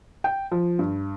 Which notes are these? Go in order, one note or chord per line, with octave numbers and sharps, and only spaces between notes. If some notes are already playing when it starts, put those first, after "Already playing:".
G5
F3
G2